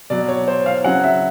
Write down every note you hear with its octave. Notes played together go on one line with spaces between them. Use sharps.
B2 F#3 D5
C#5
C5
F5
C#3 F#3 F#5
E5